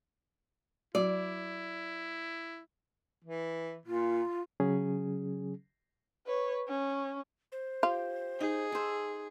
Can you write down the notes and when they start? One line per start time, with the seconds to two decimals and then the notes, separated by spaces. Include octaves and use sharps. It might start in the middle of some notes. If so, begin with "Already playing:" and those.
0.95 F#3 E4 F#4 D5
3.24 E3
3.86 A#2 F4
4.60 C#3 F#3 C#4 G#4
6.27 B4 C#5
6.68 C#4
7.52 C5
7.83 F4 G4
8.41 D#4 G#4
8.72 A4 C5